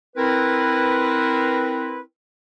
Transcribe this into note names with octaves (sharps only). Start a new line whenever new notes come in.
C4 E4 A#4 B4